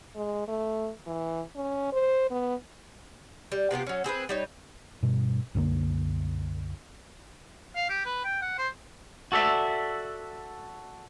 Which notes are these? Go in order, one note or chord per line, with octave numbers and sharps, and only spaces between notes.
G#3
A3
E3
C#4
C5
B3
G3
C3 B3 F4 G4
F#3 C#4
C4 G#4 A#4 B4
G3 D#4 C#5
G2 B2
C2 F#2 D3 A#3
F5
G4
B4
G5
F#5
C5
F#4 A4 D5 E5